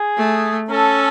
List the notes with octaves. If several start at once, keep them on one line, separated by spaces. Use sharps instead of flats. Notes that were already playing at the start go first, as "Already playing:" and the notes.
Already playing: G#4
A3
C#4 A4